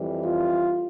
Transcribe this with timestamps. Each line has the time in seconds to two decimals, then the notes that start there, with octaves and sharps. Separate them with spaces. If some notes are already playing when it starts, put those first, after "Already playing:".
Already playing: F2 E3 G3
0.23 F4